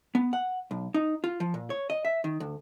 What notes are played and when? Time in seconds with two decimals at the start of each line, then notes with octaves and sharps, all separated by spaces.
0.15 B3
0.33 F#5
0.71 B1
0.94 D#4
1.24 F4
1.40 F3
1.54 A#2
1.70 C#5
1.90 D#5
2.05 E5
2.24 D#3
2.40 D2